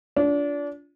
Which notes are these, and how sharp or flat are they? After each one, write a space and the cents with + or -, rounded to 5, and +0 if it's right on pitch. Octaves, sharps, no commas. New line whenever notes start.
D4 -30 F4 +0